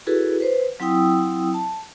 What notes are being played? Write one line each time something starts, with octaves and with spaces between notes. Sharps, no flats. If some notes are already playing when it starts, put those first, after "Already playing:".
E4 F#4 G#4 A4 B4
B4 C5
F#3 C4 E4 G5 D#6 E6
A5